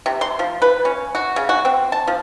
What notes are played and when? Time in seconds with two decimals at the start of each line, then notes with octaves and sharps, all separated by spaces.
0.06 C3
0.21 C6
0.39 F3
0.62 B4
0.85 C#4
1.15 F#4
1.36 C#3
1.49 F#4
1.65 C4
1.92 A5
2.07 F3